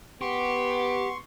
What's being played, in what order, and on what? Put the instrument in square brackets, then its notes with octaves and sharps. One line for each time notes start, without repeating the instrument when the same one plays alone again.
[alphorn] B3 [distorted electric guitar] G4 [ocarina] F#5 [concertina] C6 C#6